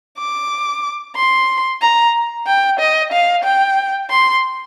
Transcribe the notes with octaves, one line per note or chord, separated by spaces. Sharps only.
D6
C6
A#5
G5
D#5
F5
G5
C6